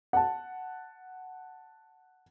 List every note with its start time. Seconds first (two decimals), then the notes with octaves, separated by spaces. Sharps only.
0.13 F#5 A5